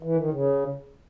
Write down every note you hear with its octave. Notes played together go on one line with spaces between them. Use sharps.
E3
D#3
C#3